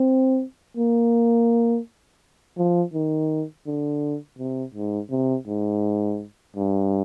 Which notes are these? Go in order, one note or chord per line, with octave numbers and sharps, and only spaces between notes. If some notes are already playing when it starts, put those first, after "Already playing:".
Already playing: C4
A#3
F3
D#3
D3
C3
G#2
C3
G#2
G2